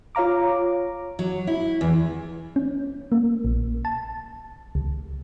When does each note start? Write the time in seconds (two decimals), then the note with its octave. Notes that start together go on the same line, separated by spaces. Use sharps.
0.15 F4 C#5 F5 A#5 D6
1.19 F#3
1.47 E4
1.81 E2
2.56 C#4
3.12 A#3
3.45 A#1
3.85 A5
4.75 C#2